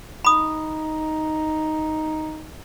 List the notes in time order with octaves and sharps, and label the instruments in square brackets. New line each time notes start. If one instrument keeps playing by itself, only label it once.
[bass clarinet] D#4 [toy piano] B5 D#6